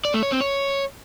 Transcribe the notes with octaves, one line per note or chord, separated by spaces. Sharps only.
D5
A3
C#5
C4
C#5